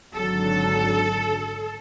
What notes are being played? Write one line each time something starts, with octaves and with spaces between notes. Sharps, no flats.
G#1 D3 F#3 A4